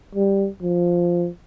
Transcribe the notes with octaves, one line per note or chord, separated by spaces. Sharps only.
G3
F3